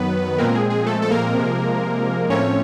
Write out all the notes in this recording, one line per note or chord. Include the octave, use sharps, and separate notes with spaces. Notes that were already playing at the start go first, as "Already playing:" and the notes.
Already playing: F#2 D#3 F#3 B3 B4
A#2 F3 G#3 A#3 C4 A#4
G#4
G#4
A3 A4
A4
A#3 A#4
C3 F3 G#3
A2 F3 A3 C4 C#4 C#5